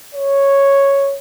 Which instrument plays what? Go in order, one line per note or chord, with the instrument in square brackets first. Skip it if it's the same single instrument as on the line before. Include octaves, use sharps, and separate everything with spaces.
[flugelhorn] C#5